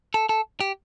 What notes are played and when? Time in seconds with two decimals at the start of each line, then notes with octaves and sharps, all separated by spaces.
0.14 A4
0.29 A4
0.60 G4